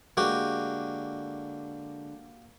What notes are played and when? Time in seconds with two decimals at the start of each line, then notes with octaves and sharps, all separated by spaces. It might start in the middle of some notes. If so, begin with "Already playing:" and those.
0.17 D3 G#3 A#3 F#4 G4